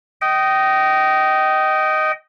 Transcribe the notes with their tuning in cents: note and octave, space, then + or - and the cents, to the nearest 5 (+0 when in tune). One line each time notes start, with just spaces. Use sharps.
D#5 +0 G5 -30